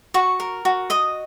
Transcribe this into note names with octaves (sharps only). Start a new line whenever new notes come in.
F#4 C#6
A#4
F#4
D#5 D#6